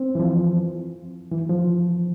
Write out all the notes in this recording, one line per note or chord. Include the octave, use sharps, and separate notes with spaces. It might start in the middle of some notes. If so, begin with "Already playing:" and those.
Already playing: C4
E3
F3
E3
F3